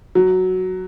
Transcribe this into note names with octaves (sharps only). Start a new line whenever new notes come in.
F#3